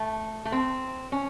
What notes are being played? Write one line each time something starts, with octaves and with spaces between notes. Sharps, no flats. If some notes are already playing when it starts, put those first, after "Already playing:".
Already playing: A3
A3
C4
C#4